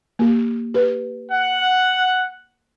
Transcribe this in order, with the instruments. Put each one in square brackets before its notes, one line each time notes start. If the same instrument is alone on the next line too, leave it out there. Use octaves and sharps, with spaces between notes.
[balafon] A#3 G4
G4 B4
[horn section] F#5